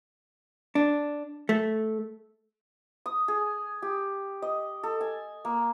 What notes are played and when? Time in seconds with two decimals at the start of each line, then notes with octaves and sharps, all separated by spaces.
0.75 D4
1.49 A3
3.06 D#6
3.28 G#4
3.82 G4
4.42 D#5
4.83 A4
5.01 G#5
5.45 A#3